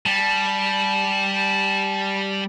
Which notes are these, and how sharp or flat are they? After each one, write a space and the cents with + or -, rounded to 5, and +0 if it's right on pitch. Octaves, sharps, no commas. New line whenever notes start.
G3 +0 A5 -30